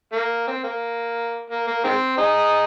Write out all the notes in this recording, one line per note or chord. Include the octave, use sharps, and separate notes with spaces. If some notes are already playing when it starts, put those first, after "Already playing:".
A#3
C4
A#3
A#3
A#3
D#3 G#3 C4
D#4 G#4